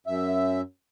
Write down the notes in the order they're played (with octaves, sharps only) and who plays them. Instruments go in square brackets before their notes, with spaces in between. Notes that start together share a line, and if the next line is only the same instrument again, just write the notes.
[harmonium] F#2 E5